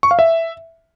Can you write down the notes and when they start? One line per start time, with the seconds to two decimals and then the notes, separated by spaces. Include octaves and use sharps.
0.03 C#6
0.11 F5
0.19 E5